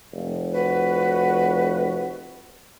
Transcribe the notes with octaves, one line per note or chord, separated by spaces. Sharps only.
F1
F#4 B4